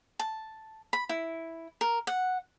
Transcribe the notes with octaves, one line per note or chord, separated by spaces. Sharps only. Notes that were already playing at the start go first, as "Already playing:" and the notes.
A5
B5
E4
A#4
F#5